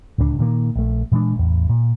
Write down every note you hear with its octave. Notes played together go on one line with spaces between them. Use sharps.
D1 C#2 C#4 D4
A#2 D#3 A#3
A#1 A3
A#2 E3 G#3 D4
A1 E2
A#2